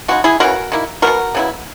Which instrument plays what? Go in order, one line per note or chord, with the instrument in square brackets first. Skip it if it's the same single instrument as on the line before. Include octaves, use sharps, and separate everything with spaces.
[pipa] C#3 G#3 D#4 F#4
E4 G#4
C#3 E3 G#3 C#4 F#4 A#4
D#3 A#3 E4
F#3 B3 F#4 A#4
B2
C#3 F#3 B3 E4